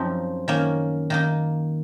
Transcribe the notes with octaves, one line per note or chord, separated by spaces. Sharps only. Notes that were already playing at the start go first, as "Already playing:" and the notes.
Already playing: F#2 F3 C4 D#4
D#3 A#3 C#4
D#3 A#3 D#4